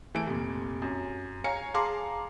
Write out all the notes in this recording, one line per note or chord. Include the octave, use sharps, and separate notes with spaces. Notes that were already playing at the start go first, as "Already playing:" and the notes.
E3 A3 D7
F1 A#2
F#2
C#5 F5 G#5 A#5 C#7
G#4 F5 A5 A#5 C6 D6